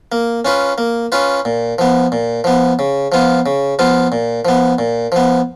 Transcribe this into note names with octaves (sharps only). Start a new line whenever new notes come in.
A#3
C#4 F4 B4
A#3
C#4 F4 B4
A#2
F3 B3
A#2
F3 B3
C#3
F3 B3 F4
C#3
F3 B3 F4
A#2
F3 B3
A#2
F3 B3